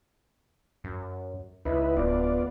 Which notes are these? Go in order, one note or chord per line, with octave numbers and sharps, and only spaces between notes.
F#2
C#2 D#4 E4 B4
D1 B3 F4 D5